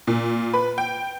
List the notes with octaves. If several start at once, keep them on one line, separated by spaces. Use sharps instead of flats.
A#2
B4
G5